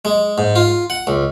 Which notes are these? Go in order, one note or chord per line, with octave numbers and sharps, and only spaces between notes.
G#3
G#2
F4
F#5
C#2